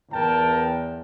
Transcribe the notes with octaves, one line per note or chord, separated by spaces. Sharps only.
E2 A#4 G5 A5